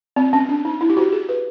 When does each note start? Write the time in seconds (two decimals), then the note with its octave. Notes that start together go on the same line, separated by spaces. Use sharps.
0.16 C4
0.33 C#4
0.49 D4
0.65 D#4
0.81 E4
0.90 G4
0.97 F#4
1.13 G#4
1.29 B4